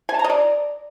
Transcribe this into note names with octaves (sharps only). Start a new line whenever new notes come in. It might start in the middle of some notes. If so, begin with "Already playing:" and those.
G#5
A5
A#5
D#5
D5